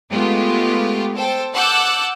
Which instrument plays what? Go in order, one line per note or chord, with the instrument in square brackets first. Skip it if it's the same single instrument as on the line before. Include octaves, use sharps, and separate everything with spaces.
[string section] G#3 A3 B3 F4 G4
A4 C5 G5
F#5 A5 D6 E6 F#6 G6